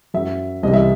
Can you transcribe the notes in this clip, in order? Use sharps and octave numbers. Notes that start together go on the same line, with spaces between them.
F#2 F#3 E5
C2 C3 E3 G3 D#5
E5